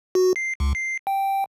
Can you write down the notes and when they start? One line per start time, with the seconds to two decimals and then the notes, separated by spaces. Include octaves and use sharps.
0.15 F#4
0.36 C7
0.60 C#2
0.75 C7
1.07 G5